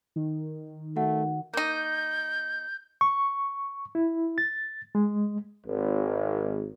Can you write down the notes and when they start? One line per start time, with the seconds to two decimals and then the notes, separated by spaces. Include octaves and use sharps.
0.16 D#3
0.96 A3 F#4 F#5
1.54 A#3 D#4 G6
3.01 C#6
3.95 E4
4.38 A6
4.95 G#3
5.67 G#1